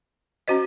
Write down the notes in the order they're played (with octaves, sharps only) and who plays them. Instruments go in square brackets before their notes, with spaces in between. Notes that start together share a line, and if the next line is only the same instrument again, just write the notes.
[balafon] C#4 F#4 C5 D#5